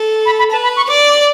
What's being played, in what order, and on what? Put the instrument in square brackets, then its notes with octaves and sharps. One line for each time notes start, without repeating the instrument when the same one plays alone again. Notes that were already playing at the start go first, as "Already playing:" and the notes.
Already playing: [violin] A4
[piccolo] B5
B5
[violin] B4 [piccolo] A5
[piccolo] B5
C#6
[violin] D5 [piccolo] D6